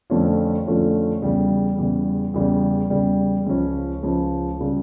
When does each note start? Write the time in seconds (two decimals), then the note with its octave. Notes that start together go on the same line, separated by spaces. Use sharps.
0.10 F2 D3 A3 C#4 F4
0.66 F2 D3 A3 C#4 F4
1.22 E2 C#3 G3
1.78 E2 C#3 G3
2.34 E2 C#3 G3
2.90 E2 C#3 G3
3.46 C#2 C#3 F3 C#4
4.02 C#2 C#3 F3 C#4
4.61 C#3 G3